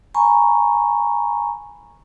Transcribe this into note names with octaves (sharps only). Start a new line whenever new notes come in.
G#5 A#5 B5 C#6